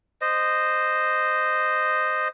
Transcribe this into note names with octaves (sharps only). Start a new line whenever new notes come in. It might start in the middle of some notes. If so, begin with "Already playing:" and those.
C5 D#5